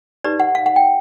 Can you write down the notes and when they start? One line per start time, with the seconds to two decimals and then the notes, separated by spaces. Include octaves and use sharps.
0.24 D#4 G4 B4 D5
0.40 F#5
0.55 F5
0.66 F#5
0.76 G5